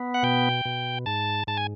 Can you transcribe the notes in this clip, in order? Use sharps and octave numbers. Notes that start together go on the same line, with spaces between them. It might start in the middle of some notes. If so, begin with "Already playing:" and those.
Already playing: B3
F#5
B2 G5
B2
G#2 A5
G#2 A5
G#5